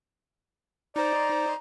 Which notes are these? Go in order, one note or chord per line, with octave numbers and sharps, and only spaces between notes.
D#4 C5 D5 A#5